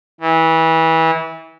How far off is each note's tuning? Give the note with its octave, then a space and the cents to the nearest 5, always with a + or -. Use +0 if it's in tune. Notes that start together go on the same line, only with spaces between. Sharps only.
E3 -25